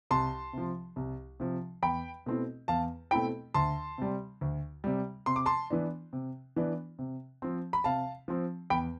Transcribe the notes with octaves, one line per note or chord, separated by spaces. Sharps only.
C2 A5 C6
C3 F3
C2
C3 F3
E2 G5 B5
B2 A3 C4 E4
E2 F5 A5
B2 A3 C4 E4 G5 B5
D2 A5 C6
C3 G3
D2
C3 G3
C3 C6
D6
A5 C6
E3 B3 D4
C3
E3 B3 D4
C3
F3 C4
B5
C3 F5 A5
F3 C4
E2 G5 B5